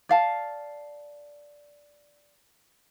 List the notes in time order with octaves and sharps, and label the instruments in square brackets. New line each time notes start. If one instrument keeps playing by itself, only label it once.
[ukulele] D5 F5 A5